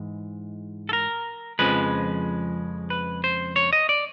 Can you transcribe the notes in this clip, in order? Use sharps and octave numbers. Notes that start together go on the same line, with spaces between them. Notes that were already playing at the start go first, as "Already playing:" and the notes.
Already playing: G#2 E3 G#3
A4
A#4
F2 C#3 F3 G#3 B4
B4
C5
C#5
D#5
D5